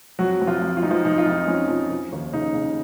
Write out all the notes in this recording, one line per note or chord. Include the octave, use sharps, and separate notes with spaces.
F2 F#3 F#4
F2
F3 F4
F2
F4
F2 D#4
F3 F4
F2 D#4
F4
F2
D#4
F3 C#4
F3
F3
D#2
C#3 D#4
C#3